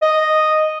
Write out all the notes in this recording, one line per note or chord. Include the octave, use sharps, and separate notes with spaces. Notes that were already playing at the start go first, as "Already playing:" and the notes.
D#5